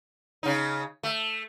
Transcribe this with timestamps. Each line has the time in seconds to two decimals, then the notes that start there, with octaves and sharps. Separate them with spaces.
0.43 C#3 D#4
1.03 A3